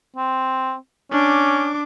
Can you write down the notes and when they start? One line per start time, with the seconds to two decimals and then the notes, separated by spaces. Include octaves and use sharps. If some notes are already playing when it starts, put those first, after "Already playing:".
0.16 C4
1.12 C#4 D4 D6